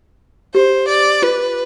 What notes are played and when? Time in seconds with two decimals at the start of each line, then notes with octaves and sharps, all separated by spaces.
0.55 G4 C5
0.89 D5
1.22 F4 B4